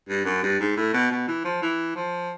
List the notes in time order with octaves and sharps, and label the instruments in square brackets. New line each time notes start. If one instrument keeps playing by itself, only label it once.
[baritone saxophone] G2
F#2
G2
G#2
A2
B2
B2
E3
F3
E3
F3